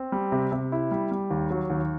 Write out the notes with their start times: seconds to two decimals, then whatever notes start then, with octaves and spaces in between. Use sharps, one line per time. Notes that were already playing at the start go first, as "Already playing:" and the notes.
Already playing: C4
0.12 G3
0.32 C3
0.52 C3
0.72 E4
0.91 G3
1.11 G3
1.31 D#2
1.51 F#3
1.70 D#2